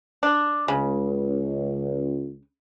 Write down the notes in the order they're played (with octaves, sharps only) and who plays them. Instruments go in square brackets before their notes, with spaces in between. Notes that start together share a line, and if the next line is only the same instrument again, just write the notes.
[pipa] D4
[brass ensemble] C#2 [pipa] C#3